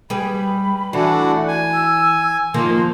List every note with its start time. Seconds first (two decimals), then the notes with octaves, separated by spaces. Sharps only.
0.10 G3 G#4 B4 B5
0.93 E3 A3 D4 F#4
1.48 G#5
1.73 E6
2.54 D#3 F3 A#3 C6